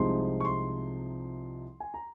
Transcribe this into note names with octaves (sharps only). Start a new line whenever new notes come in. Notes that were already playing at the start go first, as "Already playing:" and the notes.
Already playing: C2 C3 F3 G#3 D#4 C6
C#6
C6
G#5
A#5